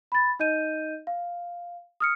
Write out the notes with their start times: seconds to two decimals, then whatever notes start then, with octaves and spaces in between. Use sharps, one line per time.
0.12 B5 A6
0.39 D#4 D#5 G6 D#7
1.07 F5
2.00 D#6 F6 C#7